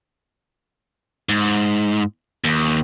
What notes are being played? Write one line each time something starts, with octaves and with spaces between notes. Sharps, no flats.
G#2
D#2